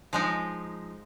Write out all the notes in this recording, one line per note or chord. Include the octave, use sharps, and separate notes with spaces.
F3 G#3 D#4